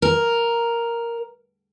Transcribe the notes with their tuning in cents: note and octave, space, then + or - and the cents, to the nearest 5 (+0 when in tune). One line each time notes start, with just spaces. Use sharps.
A#4 +0